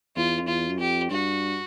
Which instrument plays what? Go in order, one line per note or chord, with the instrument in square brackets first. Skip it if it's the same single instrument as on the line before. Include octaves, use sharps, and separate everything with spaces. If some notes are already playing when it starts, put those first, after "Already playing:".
[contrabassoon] E2 [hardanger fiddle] F4
[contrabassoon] F2
[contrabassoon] E2 [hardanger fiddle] F4
[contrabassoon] F#2
[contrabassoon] F2 [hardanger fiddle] G4
[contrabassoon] G2 [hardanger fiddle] F#4